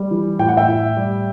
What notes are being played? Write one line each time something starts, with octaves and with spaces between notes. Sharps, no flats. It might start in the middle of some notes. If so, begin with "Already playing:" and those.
Already playing: G3
E3
A2 G5
F#5
E5 G5
A2
G3